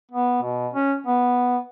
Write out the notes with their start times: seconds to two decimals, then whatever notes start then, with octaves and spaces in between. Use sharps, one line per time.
0.12 B3
0.42 B2
0.74 C#4
1.07 B3